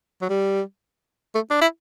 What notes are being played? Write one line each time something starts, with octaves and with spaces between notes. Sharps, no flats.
F#3
G3
A3
D4
E4